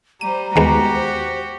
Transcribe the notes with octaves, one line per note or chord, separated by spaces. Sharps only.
G3 C5 A#5 D#7
D#2 G#3 B3 F#4 G4 A#5
C5